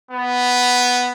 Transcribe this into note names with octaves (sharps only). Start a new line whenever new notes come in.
B3